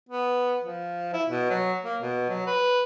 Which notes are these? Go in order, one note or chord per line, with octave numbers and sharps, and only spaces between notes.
B3
F3
E4
B2
F#3
A#3
B2
F#3
B4